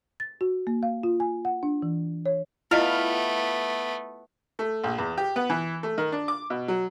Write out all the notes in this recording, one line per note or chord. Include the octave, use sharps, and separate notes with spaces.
A6
F#4
A#3
F5
F4
G#5
F#5
D4
E3
C#5
A3 B3 E4 F4 D#5 F5 B5
A3
A#1
E2
G4
B3
E3
A3
D#3
D4
D6
B2
F#3